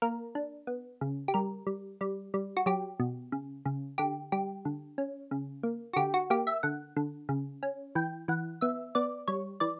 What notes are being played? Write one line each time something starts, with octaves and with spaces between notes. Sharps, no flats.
A#3 A#4
D4
B3
C#3
G4
G3 A#4
G3
G3
G3
F#4
F#3 G4
B2
C#3
C#3
D3 G4
G3 G4
D3
C#4
C#3
A#3
F#4
D3 G4
F#4
A#3 G4
E5
D3 F#5
D3
C#3
C#4
E3 G5
E3 F#5
B3 E5
B3 D5
G3 C#5
E3 D5